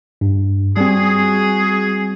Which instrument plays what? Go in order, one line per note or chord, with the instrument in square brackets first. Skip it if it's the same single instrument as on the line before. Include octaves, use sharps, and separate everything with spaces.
[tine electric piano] G2
[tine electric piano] G3 C4 [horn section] F#4 G#4